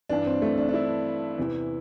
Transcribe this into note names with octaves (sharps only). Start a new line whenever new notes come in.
G2 E3 D4
C4
A3
D4
D4
E4
E2 C3 E3